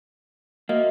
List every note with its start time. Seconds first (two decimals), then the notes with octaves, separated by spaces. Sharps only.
0.69 A#3 F#4 D#5 E5